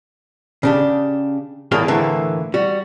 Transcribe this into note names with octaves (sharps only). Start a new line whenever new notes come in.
C#3 D4 G4
E2 A2 A#3 G#4 F5 G5
A2 D3 E3 A3 A#3
G3 F#4